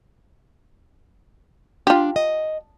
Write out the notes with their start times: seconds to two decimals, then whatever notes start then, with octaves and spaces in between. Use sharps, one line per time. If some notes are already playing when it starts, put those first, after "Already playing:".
1.87 D4 F4 G4
2.16 D#5